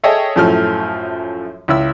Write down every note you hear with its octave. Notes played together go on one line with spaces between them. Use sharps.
G#4 A4 C#5 D#5 E5 G5
F#2 A2 F3 A3 F6
C#2 E4 E6